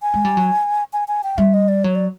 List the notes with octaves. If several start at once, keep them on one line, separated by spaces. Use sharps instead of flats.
G#5
G#3
G3
F#3
G#5
G#5
G5
G3 E5
D#5
D5
F#3 C#5
D5